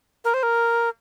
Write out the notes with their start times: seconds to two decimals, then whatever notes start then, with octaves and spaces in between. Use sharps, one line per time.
0.25 A#4
0.34 C5
0.43 A#4